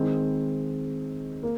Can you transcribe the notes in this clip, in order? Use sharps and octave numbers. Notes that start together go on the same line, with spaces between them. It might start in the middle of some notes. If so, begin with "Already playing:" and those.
Already playing: D#3 G#3 C4
A#3